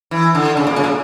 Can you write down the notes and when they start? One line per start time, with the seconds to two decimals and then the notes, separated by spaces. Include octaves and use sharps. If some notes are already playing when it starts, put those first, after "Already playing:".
0.11 E3
0.35 D3
0.57 C#3
0.67 A#2
0.76 C#3
0.84 A#2